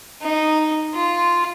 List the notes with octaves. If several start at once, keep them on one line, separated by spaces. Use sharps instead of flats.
D#4
F4